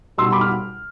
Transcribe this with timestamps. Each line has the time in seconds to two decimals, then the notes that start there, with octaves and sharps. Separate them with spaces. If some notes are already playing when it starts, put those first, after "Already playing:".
0.18 B2 G3 C6 E6
0.32 B5 D6
0.41 F6